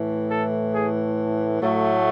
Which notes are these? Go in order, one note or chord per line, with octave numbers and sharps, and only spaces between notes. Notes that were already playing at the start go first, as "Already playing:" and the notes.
Already playing: A2 E3 A3
A4
G#4
A2 F#3 A3